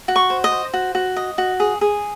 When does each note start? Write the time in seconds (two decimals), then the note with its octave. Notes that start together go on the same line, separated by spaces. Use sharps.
0.08 F#4
0.16 C#6
0.30 C5
0.44 D#5
0.52 C5
0.73 F#4
0.95 F#4
1.16 D#5
1.38 F#4
1.60 G#4
1.81 G#4